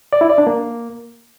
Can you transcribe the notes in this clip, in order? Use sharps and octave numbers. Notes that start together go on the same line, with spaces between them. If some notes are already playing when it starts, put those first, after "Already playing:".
D5
E4
D5
D4
A#3